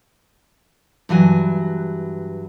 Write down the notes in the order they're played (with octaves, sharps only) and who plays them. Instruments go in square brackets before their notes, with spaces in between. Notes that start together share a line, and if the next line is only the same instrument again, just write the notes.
[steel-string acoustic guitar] G2 E3 F#3 G#5